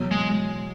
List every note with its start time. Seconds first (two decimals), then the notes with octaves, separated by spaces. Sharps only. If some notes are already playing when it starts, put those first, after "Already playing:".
Already playing: E2 B2 F#3
0.11 G#3